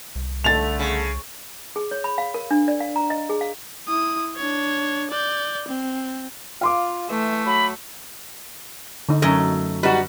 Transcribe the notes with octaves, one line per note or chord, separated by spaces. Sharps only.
C2
D3 A3 A6 F7
C#3
G#4
C#5
B5
F5
A#4
D4
D5
F5
A#5
D#5
G#4
F5
E4 D#6
D4 C#5
D5 G6
C4
F4 F5 C6 D6
E3 A3
F#3 B5
D3 D#4
F#2 F#3 A3 A#4 D#5
G3 D#4 F#4 B4